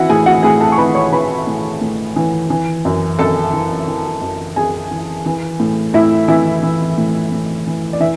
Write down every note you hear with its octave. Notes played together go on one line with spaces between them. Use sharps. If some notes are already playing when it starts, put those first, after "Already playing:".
Already playing: E3 E4 F#4 E5 F#5
A2 G#4 G#5
F#4 F#5
A2 G#4 G#5
A4 A5
C#6
E3 B4 B5
C#5 C#6
E3 B4 B5
A2
A2
E3
E3
F#2
F#2 A4 A5
E3
E3
F#2
F#2 G#4 G#5
E3
E3
A2
A2 E4 E5
E3 E4 E5
E3
A2
A2
E3
D5
E3 E5